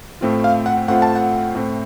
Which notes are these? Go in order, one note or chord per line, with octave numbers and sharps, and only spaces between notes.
A2 A3 C4 F4
F5
F#5
A2 A3 C4 F4 F#5
A5
F#5
A2 A3 C4